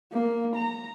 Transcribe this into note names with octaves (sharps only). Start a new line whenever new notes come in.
A#3
A#5